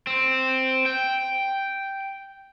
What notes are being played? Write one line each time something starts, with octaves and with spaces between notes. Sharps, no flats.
C4
G5